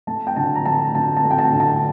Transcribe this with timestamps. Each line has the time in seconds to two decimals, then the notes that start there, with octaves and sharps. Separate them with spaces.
0.07 A3 A5
0.27 G5
0.36 D3 A5
0.55 A#5
0.66 A3 A5
0.95 D3 A5
1.16 A5
1.24 A3
1.31 G5
1.38 A5
1.53 D3
1.60 A5